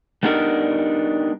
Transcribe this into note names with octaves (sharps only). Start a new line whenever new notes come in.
G3 B3 D4 D#4 G#4 A#4